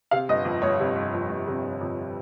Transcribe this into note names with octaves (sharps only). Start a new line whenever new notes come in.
C3 F5
G1 D#5
F2
G1 C#5
C3
G1
F2
G1
C3
G1
F2